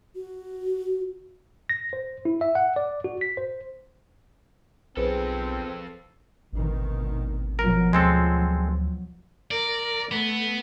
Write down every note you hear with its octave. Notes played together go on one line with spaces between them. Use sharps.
F#4
A#6
C5
E4
E5
F#5
D5
F#4
B6
C5
B1 F3 C4 G#4 A4 B4 C5
G#1 D2 B2 D#3
B2 F3 F#3 A#4
D2 G#3 C4 A4
A#4 D5
A3 B3